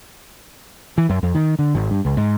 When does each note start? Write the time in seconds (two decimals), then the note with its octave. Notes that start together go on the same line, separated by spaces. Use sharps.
0.98 E3
1.09 F#2
1.23 F2
1.35 D#3
1.59 D3
1.75 G#1
1.91 G2
2.05 C#2
2.17 G#2